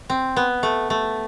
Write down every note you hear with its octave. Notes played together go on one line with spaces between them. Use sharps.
C4
B3
A3
A3